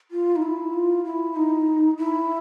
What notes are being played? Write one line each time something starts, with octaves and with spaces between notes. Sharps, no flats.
F4
D#4
E4
F4
E4
D#4
E4